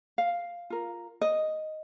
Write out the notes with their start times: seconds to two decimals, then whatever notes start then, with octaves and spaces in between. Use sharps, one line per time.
0.18 F5
0.70 F4 A#4
1.21 D#5